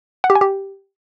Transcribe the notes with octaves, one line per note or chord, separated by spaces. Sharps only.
F#5
G4
G#5
G4